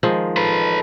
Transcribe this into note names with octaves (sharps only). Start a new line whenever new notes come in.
D#3 F3 G#3
A4 B4